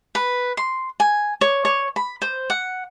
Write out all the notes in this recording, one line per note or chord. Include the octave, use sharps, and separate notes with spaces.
B4
C6
G#5
C#5
C#5
B5
C5
F#5